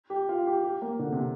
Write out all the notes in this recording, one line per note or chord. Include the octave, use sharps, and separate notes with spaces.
G4
F4
G4
G4
A#3
D3
C3